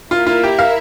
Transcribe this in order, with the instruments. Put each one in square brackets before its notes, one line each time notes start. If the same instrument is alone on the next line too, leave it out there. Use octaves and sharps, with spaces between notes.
[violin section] A#3 E4 A#4 E5 [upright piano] F4
[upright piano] F4
G4
F5